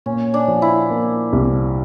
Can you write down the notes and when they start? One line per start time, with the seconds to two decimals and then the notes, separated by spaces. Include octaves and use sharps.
0.06 A#2 C#4
0.34 D4
0.48 F3
0.62 E4
0.90 A#3
1.33 C2